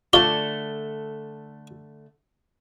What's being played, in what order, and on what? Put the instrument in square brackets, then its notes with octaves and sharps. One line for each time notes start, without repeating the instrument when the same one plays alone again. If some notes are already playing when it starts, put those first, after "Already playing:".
[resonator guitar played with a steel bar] D3 A3 [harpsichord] F4 C#5 D5 [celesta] G7